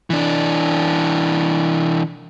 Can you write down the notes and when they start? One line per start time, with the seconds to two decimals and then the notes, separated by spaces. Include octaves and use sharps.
0.10 E3 D4